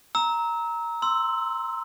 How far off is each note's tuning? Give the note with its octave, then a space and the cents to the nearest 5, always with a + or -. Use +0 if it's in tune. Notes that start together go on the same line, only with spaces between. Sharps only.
A#5 +0 E6 -30
C6 -5 E6 +0